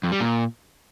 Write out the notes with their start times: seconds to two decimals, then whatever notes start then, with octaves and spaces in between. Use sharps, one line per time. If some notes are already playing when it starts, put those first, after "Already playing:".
0.03 F2
0.12 G3
0.20 A#2